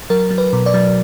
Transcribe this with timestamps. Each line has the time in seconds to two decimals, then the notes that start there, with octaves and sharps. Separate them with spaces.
0.10 F#3 A#4
0.31 F#3
0.38 B4
0.53 B2
0.66 D5
0.74 F#3